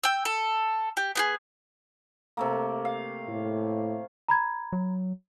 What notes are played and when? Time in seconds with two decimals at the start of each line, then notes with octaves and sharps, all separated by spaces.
0.04 G5 E6
0.25 A4
0.97 G4
1.15 B3 G4 G#4
2.37 C3 A3 A#3
2.85 F5
3.28 A2
4.28 A#5 B5 G#6
4.73 F#3